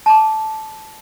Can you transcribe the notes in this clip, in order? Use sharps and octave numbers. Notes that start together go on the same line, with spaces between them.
A5 D6